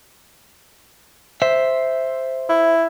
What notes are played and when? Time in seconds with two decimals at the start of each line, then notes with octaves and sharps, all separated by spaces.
1.42 C5 E5
2.49 E4